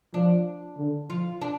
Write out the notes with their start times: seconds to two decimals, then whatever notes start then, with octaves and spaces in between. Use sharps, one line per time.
0.14 F3 D4
0.77 D3
1.10 F3 F4
1.41 D4